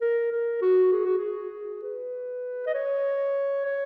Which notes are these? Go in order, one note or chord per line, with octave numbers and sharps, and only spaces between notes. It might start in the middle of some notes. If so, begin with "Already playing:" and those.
A#4
A#4
F#4
G#4
F#4
G#4
B4
D#5
C#5
C#5